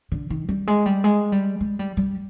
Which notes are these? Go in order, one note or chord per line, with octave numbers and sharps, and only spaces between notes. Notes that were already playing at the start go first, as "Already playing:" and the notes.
D3
D#3
G3
G#3
G3
G#3
G3
G#3
G3
G3